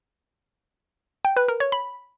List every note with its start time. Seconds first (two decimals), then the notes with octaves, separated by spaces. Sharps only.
1.25 G5
1.37 B4
1.48 A#4
1.60 C#5
1.72 B5